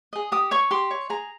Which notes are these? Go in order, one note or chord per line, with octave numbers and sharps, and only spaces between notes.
G#4 D#5
G4 D#6
C#5 C#6
G4 C6
C#5
G#4 A#5